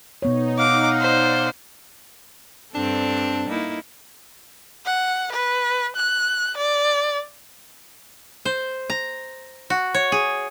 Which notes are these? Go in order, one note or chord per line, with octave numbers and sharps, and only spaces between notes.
B2 B3 D#4 C#5
F5 F#5 D6
C5 D5
G2 C4 D4 A4
A#3 D#4 E4
F#5
B4
F#6
D5
C5
A#5
F#4
C#5
G#4